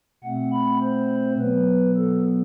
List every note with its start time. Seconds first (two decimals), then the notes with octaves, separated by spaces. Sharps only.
0.24 B2 A3 C4 F#5
0.53 B5
0.82 C5
1.39 B2 F#3 B3 B4
1.97 A4